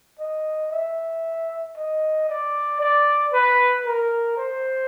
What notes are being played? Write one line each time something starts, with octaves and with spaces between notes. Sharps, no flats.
D#5
E5
D#5
D5
D5
B4
A#4
C5